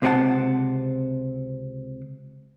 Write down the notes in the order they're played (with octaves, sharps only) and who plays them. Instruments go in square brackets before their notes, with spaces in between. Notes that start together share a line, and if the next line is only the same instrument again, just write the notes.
[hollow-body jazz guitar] C#2 C3 C4 G4 F#5 A5